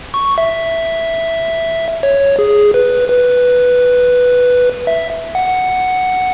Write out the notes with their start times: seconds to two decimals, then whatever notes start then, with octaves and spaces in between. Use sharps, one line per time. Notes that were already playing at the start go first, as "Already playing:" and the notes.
0.14 C#6
0.38 E5
2.03 C#5
2.39 G#4
2.74 B4
3.10 B4
4.87 E5
5.35 F#5